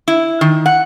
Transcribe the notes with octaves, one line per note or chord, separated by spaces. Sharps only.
E4
D#3
F#5